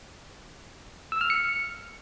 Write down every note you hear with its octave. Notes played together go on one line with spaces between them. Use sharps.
E6
F6
C#7